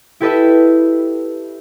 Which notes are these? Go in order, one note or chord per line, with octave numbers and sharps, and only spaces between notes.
E4 G4 A4 B4 D#5 E5